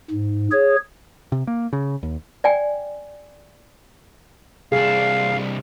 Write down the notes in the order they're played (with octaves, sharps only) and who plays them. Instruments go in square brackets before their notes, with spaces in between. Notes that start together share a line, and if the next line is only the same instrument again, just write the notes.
[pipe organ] G#2
G#4 C#5
[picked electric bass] C3
A#3
C#3
D#2
[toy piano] D5 G5 G#5
[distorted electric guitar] C2 D4 [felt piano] G#4 [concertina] F5